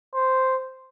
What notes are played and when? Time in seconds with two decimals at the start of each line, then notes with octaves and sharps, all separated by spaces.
0.15 C5